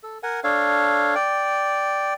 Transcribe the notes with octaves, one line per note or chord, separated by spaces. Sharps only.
A4
A#4 F#5 G#5
D4 A4 C#5 F5
D5 G5